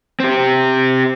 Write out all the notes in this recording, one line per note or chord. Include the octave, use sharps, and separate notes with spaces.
C4 G4